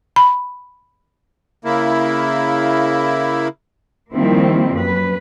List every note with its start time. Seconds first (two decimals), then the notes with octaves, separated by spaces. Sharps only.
0.16 B5
1.65 C#3 A#3 E4
4.14 D#3 F3 G3 A#3 C4 E4
4.73 F#2 B4